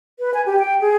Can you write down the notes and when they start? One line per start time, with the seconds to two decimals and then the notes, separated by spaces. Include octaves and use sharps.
0.19 B4
0.34 G#5
0.46 G4
0.59 G5
0.81 G#4